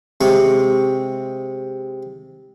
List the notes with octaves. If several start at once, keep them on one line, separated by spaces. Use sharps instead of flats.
C3 G#3 C4 C#6